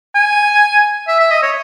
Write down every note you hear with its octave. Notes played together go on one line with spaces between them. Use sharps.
G#5
E5
E5
D#5
C#5